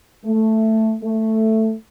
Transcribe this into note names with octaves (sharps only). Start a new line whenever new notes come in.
A3
A3